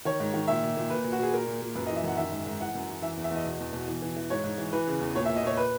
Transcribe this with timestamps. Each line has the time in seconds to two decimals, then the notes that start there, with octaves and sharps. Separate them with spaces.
0.05 D#3 C#5
0.20 G#2
0.34 D#3
0.48 A#2 E5
0.63 A#2
0.77 A#2
0.90 A#2 B4
1.04 A#2
1.12 F#4
1.19 A#2 G#4
1.34 A#2 A#4
1.47 A#2
1.62 A#2
1.75 F#2 B4
1.87 D#5
1.90 E3
1.96 E5
2.04 F#2 F#5
2.17 D#3 E5
2.32 G#2
2.46 G#2
2.60 E3 F#5
2.75 F#2
2.89 E3
3.02 E3 E5
3.17 E2
3.24 E5
3.31 E2 D#5
3.45 B2
3.60 E2
3.73 B2
3.88 E3
4.02 E3
4.16 E3
4.30 G#2 C#5
4.44 G#2
4.58 E3
4.73 E3 B4
4.87 C#3
5.01 E2
5.15 A#2 C#5
5.25 E5
5.29 A#2
5.36 D#5
5.43 A#2 C#5
5.57 B4